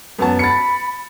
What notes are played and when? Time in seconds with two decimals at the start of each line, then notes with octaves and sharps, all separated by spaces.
0.19 F#2 B3 A5
0.39 B5 A6 C#7